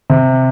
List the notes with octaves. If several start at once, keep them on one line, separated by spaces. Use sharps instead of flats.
C3